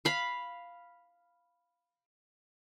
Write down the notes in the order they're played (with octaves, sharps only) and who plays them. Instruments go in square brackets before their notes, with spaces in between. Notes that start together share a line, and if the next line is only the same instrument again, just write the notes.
[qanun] F5 B5